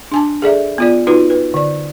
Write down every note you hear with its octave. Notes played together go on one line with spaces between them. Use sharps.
D4 G#5 A5
G#4 A4 D5 E5
B3 F4 D5
D#4 F4 F#4 B4
B4
D3 D5